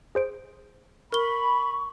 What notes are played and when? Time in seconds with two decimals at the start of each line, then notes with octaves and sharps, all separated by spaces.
0.15 G#4 C5 D7
1.12 A#4 B5 C#6 G7